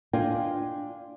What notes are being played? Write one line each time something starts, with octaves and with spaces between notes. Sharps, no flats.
D4 F4 D#5 G5 G#5